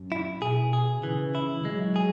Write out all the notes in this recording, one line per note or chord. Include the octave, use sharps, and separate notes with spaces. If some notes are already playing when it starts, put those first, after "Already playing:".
Already playing: F#2
E4
B2 G#4
G#4
C#3 E3
E4
F#3 G#3
G#4